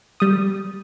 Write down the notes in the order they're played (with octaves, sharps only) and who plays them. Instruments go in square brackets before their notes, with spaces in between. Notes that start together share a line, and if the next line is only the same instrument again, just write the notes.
[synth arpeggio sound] G3 D#6